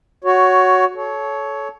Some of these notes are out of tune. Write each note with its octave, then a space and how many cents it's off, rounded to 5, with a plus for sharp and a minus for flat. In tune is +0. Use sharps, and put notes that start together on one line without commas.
F#4 +0 C#5 +10
A4 -25 C#5 +10